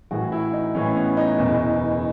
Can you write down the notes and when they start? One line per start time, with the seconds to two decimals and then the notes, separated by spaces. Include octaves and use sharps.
0.11 A1 A2 E3 F#4
0.32 E4
0.53 D#4
0.75 A1 A2 E3 C#4
0.96 B3
1.17 D#4
1.38 F#1 E2 B2